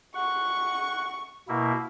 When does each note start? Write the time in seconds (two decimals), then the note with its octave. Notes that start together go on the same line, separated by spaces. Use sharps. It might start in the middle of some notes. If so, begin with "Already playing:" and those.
0.15 F#5 C#6
1.48 B2 A#3 E4